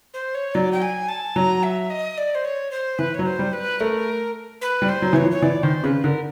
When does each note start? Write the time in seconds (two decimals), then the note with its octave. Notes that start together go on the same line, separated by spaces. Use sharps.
0.14 C5
0.35 C#5
0.54 F#3 D5
0.72 G5
0.82 G#5
1.08 A5
1.36 F#3 A#5
1.63 E5
1.90 D#5
2.18 D5
2.35 C5
2.45 C#5
2.71 C5
2.99 E3 B4
3.14 F#3 C#5
3.25 C5
3.39 G3
3.53 B4
3.80 A3 A#4
4.61 B4
4.82 G3
4.88 C5
5.02 F#3
5.13 E3 C#5
5.22 F3
5.31 C#5
5.42 E3 D5
5.63 D#3 C5
5.84 C#3 B4
6.04 D3 A#4